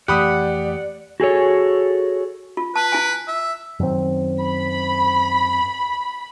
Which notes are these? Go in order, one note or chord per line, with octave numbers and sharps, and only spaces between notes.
F2 E3 A3 G4 D5 F#5 B5 D#6
F#4 G#4 A4 C#5
F4
B4 A5
E4 G#5
E5
F#2 D#3 C4
B5